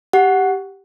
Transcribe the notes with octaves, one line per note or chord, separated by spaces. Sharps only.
G4 F#5